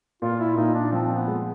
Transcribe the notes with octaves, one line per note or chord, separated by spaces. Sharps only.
A#2 F4
E4
A#2 D#4
D4
F3 C4
B3
G#3